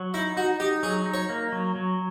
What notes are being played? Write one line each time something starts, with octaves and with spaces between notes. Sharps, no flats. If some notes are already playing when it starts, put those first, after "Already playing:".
Already playing: F#3
D#4 E4
D#4 F#4
D#4 G4
F#3 G#4
D#4
C#5
A#3
F#3
F#3